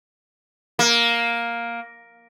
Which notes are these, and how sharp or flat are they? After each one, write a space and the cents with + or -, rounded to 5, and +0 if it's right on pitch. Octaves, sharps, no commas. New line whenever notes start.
A#3 +5